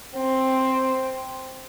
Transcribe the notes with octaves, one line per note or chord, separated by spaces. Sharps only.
C4